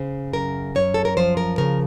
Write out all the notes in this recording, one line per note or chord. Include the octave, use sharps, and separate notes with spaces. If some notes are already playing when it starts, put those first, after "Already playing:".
Already playing: C#3 C5
F#2 A#4
F#2 C#5
A4
A#4
F3 C5
A#4
C#3 A#4